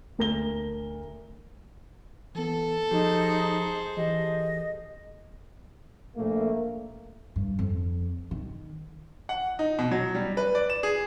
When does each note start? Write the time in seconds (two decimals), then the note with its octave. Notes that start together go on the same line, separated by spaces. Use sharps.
0.18 D2 A#4 A#6 G7
2.35 E3 B3 A4
2.91 F3 D#4 G4 G#4 C5
3.97 E3 G4 D#5
6.17 A#1 A#2 A3 A#3
7.36 G2
7.59 F2
8.31 D#3
9.29 F#5
9.59 D#4
9.79 B2
9.91 F#3
10.15 G3
10.37 B4
10.55 D5
10.70 E7
10.83 G#4